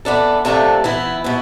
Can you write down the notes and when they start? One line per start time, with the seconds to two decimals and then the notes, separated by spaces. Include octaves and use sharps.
0.05 E3 B3 D4 A4
0.45 C3 F3 A3 D4 A4
0.84 E3 B3 E4
1.24 B2 B3 E4